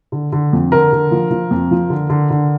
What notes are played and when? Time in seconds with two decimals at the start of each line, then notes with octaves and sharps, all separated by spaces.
0.12 D3
0.32 D3
0.53 F2
0.72 D3 A#4
0.92 D3
1.11 F3
1.31 F3
1.51 F2
1.71 F3
1.90 D3
2.10 D3
2.30 D3